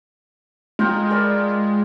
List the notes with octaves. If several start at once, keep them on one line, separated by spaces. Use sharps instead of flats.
G#3 F4 G5 A#5
A#4 D5 B5